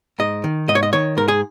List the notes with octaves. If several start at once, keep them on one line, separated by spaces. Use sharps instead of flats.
G#2 D#5
D#3
G#2 D#5
C#5
D#5
D#3 C#5
G#2 A#4
G#4